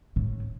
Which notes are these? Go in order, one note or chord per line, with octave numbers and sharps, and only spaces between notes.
A2